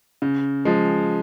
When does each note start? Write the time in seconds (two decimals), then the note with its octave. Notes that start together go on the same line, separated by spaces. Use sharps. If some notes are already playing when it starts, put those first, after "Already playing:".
0.22 C#3
0.65 F3 G#3